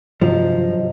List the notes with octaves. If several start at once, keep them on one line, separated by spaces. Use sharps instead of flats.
G2 C3 F3 F#3 D#5